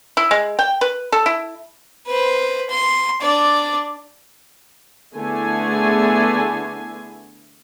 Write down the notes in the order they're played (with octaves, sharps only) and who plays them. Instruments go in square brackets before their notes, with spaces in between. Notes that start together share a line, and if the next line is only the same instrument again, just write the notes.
[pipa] E4
G#3
G5
B4
A4
E4
[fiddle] B4 C5
C6
D4 D5
[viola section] D3 A3 B3 E4 G#4 G#5